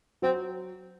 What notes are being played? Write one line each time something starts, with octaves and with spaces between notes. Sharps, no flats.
F#3 C4